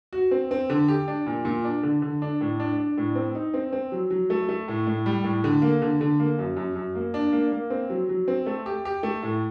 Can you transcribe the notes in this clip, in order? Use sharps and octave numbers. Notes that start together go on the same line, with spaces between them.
F#4
C4
C4
D3
G4
D4
A#2
A#2
D4
D3
D3
D4
A2
D4
D4
A2
C4
D#4
C4
C4
F#3
F#3
A3
A3
A2
A2
G3
A2
D3
A#3
D3
D3
A#3
F#2
F#2
F#2
A#3
D4
A#3
A#3
C4
F#3
F#3
C4
A3
G4
G4
A3
A2